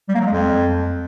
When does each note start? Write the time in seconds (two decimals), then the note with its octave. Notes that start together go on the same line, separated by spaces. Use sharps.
0.09 G3
0.15 A#3
0.21 F#3
0.26 G#3
0.32 F2